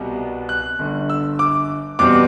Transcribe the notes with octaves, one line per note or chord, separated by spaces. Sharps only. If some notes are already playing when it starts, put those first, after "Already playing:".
Already playing: C2 B2 G3 B3
F#6
G1 G2 D3
E6
D6
E2 B2 G3 C4 D6